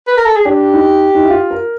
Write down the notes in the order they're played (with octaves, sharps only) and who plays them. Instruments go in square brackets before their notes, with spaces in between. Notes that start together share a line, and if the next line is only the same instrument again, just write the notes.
[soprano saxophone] B4
A#4
A4
G#4
[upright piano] D4 [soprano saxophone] G4
[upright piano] D#4
D#4
E4
F4
A#4